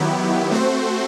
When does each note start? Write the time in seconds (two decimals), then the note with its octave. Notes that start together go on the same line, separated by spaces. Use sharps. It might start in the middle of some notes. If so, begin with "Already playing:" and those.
Already playing: D#3 F#3 B3 E4 G4
0.51 A3 C4 F#4 C5